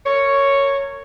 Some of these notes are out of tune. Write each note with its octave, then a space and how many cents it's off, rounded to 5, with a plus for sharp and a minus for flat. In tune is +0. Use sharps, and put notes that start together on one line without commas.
A#4 -30 C#5 +0